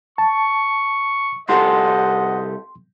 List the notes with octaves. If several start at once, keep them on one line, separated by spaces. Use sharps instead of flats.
A5 C#6
C2 G4 A4 D#5 F#5 C6